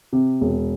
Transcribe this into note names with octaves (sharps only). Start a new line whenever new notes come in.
C3
E1